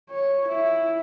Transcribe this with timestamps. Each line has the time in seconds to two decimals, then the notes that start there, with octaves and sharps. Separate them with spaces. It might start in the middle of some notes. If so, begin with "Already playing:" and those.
0.10 C#5
0.48 E4